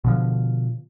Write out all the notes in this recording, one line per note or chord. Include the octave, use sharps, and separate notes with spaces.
B2 D3 F3